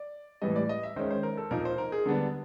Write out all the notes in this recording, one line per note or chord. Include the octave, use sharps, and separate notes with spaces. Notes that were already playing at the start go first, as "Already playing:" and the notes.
Already playing: D5
A2 E3 G3 D#5
D5
D#5
E5
D#3 G#3 C#4 C5
C5
A#4
A4
A#2 F3 A#3 D#4 A#4
C5
A#4
G#4
D3 G3 B3 D4